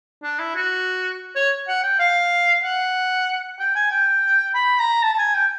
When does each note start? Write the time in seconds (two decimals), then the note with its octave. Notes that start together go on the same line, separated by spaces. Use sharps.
0.23 D4
0.39 E4
0.55 F#4
1.35 C#5
1.68 F#5
1.83 G5
1.99 F5
2.64 F#5
3.59 G5
3.75 G#5
3.91 G5
4.55 B5
4.80 A#5
5.03 A5
5.13 A5
5.18 G#5
5.35 G5